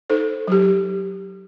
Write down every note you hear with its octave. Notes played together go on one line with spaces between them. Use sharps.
D#4 A4 C5
F#3 G4